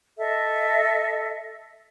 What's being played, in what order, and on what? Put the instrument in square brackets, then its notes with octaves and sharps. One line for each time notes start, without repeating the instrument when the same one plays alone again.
[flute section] A4 D#5 E5